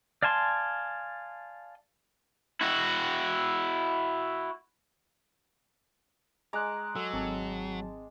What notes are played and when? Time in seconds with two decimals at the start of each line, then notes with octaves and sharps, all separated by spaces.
0.23 D5 F5 G#5 A5 C6
2.61 E4 F#4
6.53 G#3 A#5 D6 F#6
6.96 F#3 A4 G#5 E6
7.13 G#1 C4 A5